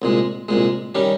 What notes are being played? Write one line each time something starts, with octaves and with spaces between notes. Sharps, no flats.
C2 A#2 G#3
C2 A#2 G#3
D#3 G3 C#4 G4